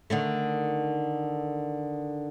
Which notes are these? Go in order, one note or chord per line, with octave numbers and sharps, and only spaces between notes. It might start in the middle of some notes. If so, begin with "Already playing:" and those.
D3 D#3 A3